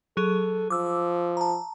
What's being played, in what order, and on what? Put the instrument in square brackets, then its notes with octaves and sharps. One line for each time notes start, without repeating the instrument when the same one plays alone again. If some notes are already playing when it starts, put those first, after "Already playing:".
[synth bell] F#3 G#4 [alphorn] A4
[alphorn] F3 [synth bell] D6 E6
[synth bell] A5 A#5